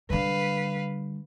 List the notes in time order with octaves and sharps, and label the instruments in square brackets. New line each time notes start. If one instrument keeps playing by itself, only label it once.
[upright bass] D3 G3 [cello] B4 F5